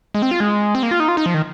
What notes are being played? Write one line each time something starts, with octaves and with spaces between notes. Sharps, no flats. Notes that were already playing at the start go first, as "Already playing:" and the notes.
G#3
C4
F4
G#3
C4
A#3
F4
D#4
F4
D#4
F3
D#3